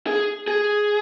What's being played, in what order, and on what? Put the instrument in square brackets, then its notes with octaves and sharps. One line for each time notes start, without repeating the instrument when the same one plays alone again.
[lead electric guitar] G#4
G#4